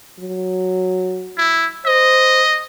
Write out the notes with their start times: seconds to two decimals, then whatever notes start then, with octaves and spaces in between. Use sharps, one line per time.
0.20 F#3
1.38 E4
1.86 C5 D#5